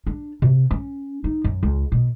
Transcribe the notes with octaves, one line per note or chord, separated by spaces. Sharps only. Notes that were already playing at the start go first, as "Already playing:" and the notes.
D4
C3
C#4
D#4
F#2
C#2
B2